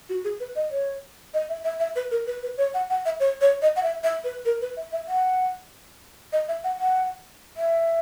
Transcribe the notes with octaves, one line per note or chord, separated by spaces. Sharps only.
F#4
G#4
B4
D#5
C#5
D#5
E5
E5
E5
B4
A#4
B4
B4
C#5
F#5
F#5
E5
C#5
C#5
D#5
F#5
E5
E5
B4
A#4
B4
E5
E5
F#5
D#5
E5
F#5
F#5
E5